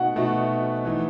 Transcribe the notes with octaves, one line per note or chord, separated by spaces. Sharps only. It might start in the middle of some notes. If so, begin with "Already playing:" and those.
Already playing: B2 A3 D#4 F#4 F#5
B2 A3 D#4 F#4
E3 A3 D#4